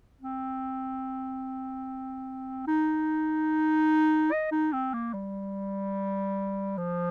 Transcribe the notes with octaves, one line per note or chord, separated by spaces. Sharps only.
C4
D#4
D#5
D#4
C4
A#3
G3
F3